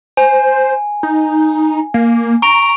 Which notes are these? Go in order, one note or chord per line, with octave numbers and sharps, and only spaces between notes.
C5 G#5
D#4
A#3
A#5 C#6 D7 F7